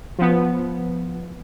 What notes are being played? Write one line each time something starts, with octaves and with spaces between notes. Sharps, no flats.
F3 B3